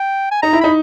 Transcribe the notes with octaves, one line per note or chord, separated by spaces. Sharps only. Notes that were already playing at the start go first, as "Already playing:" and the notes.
Already playing: G5
G#5
D#4 A#5
E4
D#4 B5